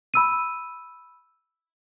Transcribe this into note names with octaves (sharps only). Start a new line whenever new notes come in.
B5 E6 D#7